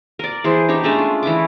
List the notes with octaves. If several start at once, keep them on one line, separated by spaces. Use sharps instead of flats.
A#4 D5
E3 G#4 C5
D4 D#4 G4 C#5
G#3 A3 C#4 D4
F4
E3 C#4 E4 D6